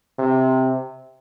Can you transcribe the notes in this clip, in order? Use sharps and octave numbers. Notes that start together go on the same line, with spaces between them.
C3